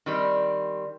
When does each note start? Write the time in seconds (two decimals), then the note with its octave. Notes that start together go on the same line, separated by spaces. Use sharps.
0.06 D#3 G3 C4